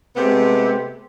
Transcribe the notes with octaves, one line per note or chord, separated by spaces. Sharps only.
C3 G#3 A3 B3 C4 G4